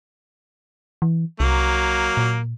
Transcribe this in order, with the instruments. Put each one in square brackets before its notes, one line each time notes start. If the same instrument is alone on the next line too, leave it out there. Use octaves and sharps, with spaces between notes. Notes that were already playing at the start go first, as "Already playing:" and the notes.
[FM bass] E3
[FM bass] C2 [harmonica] F#3 A#3
[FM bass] A#2